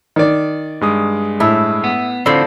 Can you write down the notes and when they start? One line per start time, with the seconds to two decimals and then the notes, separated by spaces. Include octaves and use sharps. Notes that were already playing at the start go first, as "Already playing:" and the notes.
0.16 D#3 D5
0.81 G2 G#3 D#6
1.40 A2 E5
1.84 B3
2.26 A2 D3 F3 C4 C5 D5 B5 E6